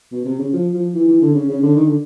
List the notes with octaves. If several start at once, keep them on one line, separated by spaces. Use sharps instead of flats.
B2
C3
C#3
F3
F3
E3
E3
D3
C#3
C#3
D3
D#3
D3